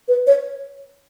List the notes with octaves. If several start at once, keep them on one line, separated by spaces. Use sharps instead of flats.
B4
C#5